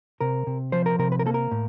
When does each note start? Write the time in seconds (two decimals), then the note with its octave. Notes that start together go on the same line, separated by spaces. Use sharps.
0.21 C3 A#4
0.47 C3
0.72 F3 C5
0.86 A#4
0.99 C3 A#4
1.12 B4
1.19 A#4
1.26 A#3 A4
1.34 A#4
1.51 A2